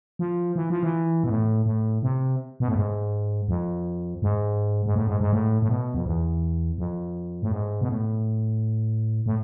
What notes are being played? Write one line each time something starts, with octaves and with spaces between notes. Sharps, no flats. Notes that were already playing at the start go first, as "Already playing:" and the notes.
F3
E3
F3
E3
B2
A2
A2
C3
B2
A2
G#2
F2
G#2
G#2
A2
G#2
G#2
A2
A2
B2
F2
E2
F2
A2
G#2
B2
A2
A2